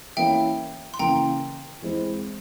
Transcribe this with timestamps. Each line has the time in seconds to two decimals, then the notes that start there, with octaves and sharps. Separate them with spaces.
0.17 E3 A#3 C#4 E4 E5 G5
0.94 C6
0.99 C#3 E3 A#3 G5 A#5
1.82 E3 G#3 C4 E4